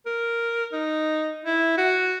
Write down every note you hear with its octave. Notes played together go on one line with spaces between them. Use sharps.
A#4
D#4
E4
F#4